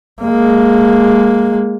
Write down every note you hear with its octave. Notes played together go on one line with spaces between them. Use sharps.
G#3 A#3